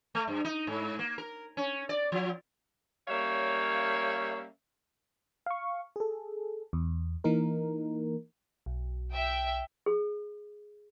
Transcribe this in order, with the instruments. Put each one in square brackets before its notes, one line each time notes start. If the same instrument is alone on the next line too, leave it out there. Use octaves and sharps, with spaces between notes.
[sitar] A3
G2
D#4
G#2
A#3
A#4
C#4
D5
F3
[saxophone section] G3 A#3 C#4 C#5 E5 F5
[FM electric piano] F5 C#6
G#4 A4
E2
E3 A#3 D#4 A#4
B1
[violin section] E5 G5
[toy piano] G#4